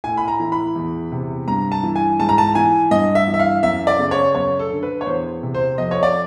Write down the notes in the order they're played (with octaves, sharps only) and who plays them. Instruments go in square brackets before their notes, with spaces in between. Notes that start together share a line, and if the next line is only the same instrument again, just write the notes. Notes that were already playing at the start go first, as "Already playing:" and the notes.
[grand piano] A2 G#5
B5
A#5
E3
B5
E2
C3
G2 A#5
A5
E3
G#5
G#2 A5
A#5
A5
E3 G#5
G2 D#5
E5
E3
E5
F5
F#2 E5
D5
C#3
C#5
F#2 C#5
A4
D3
B4
C#5
E2 C5
C3
C5
F2 D#5
C#5
D5